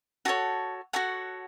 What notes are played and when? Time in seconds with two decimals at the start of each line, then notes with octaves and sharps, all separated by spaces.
0.25 F#4 A4 C#5 F#5 A5
0.93 F#4 A4 C#5 F#5